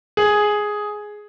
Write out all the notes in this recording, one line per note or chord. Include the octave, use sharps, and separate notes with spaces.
G#4